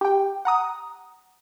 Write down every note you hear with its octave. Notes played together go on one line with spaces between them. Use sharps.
G4 G5
F#5 A#5 D#6